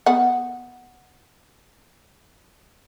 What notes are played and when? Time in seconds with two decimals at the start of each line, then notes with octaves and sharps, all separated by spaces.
0.06 B3 F#5